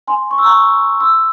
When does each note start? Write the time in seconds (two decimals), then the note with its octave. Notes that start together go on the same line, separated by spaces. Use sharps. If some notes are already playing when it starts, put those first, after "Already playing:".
0.08 G#5 C6
0.31 C#6
0.38 E6
0.45 A#5 C#6
1.00 C6 E6